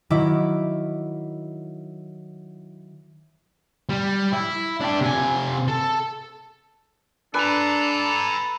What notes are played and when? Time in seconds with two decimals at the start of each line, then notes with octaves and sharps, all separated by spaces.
0.10 D#3 F#3 E4 D6
3.89 G3
4.33 E4
4.80 D4 G4
5.01 C3 G#5
5.68 A4
7.34 D4 A4 B4 G#5 A#5